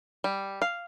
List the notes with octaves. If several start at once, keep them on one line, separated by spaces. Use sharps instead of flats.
G3
F5